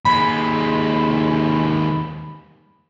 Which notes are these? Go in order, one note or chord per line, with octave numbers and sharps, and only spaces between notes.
D#2 G#3 B5